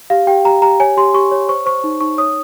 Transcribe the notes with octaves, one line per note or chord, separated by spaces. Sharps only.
G4 F5
G4 G5
G4 A#5
G4 A#5
C#5 G#5
G4 C6
G4 C#6
C#5
C5 C#6
C5 C#6
D#4
D#4 C#6
C#5 D#6